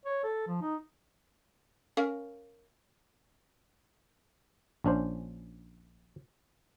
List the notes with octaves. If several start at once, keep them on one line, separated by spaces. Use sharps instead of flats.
C#5
A4
F3
D#4
C#4 A#4 F5
A#1 C#4 D4 C5